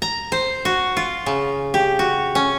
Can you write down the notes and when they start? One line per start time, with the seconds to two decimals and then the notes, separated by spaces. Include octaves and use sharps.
0.02 A#5
0.32 C5
0.65 F#4
0.97 F4
1.26 C#3
1.74 G4
1.99 F#4
2.35 C#4